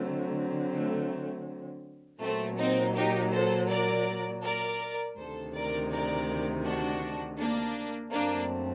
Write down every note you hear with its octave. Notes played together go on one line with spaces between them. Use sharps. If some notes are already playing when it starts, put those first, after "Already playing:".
Already playing: D3 F#3 A3 C4
A3
A#2 F#3 A3 A#3 C4
C4 D#4
D#4 G4
A4 C5
A#4 D5
A#4 D5
D2 C3 D#3 A4 C5
A#4 D5
A#4 D5
D4 F#4
A#3 D4
F#2 F#3 A3 A#3 C4 D4